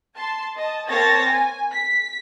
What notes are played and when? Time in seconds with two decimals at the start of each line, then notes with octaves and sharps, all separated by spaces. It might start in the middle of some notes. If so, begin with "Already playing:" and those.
0.15 A5 C6
0.55 D#5 A5
0.88 A#3 C4 C#5 A5 A6 A#6
1.28 G#5
1.72 B6